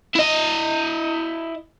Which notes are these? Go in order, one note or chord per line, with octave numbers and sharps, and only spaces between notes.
E4 D#5